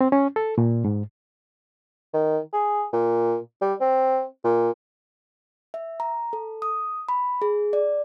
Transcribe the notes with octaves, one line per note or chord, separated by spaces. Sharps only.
C4
C#4
A4
A#2
G#2
D#3
G#4
A#2
G3
C4
A#2
E5
A#5
A4
D#6
B5
G#4
D5